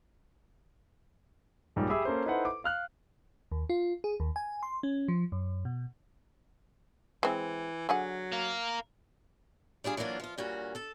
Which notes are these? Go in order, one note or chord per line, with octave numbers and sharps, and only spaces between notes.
B1 G#2 F3 G3 A#3
G4 G#4 E5 B5 E6
A#3 C#4 A4 C5
D#4 E4 A4 B4 C5 F#5
D6
F5 F6 F#6
D#2
F4
G#4
D#2
G#5
C6
C#4
F3
F#2
B2
E3 G#3 C4 E4
D3 F#3 G#4 F#5
A#4 F5
G3 D4 F4 G#4
E3 F#3 A#3 D4 F4
F3 F4
G2 A#2 C#4 F#4
A4 A5